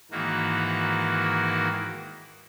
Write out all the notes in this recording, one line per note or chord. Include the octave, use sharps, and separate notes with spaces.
G#2 D#3 E3 A#3 F#4